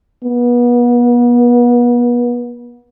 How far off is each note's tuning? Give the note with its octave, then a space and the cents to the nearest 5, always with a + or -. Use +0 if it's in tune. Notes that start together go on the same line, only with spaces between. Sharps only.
B3 -35